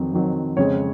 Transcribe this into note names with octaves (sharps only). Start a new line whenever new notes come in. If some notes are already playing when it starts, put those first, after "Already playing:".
Already playing: F2 D#3 F#3 C4
F2 D#3 F#3 C4
F2 C#3 G#3 C4 C#5